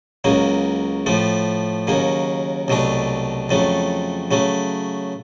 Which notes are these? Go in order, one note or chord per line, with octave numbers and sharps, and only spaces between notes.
C#2 C#3 F#3 A#3
A2 F3 A3
D#2 C#3 F#3 A#3
C2 B2 F#3 A3 D4
F2 C#3 F#3 A3
C#3 F#3 A3